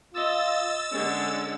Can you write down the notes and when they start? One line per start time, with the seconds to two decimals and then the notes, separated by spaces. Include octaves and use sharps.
0.14 F4 D#5 E6 A6
0.92 D3 G#3 C#4